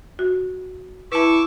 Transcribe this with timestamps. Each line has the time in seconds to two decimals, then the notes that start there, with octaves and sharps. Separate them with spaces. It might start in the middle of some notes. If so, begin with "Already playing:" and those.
0.19 F#4
1.12 E4 B4 A5 C#6 D6 E6